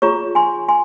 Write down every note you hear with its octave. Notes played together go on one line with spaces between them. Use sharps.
F4 G#4 C#5 A#5 C#6
G#5 C6
G#5 C6